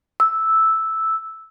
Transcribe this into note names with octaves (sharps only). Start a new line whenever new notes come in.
E6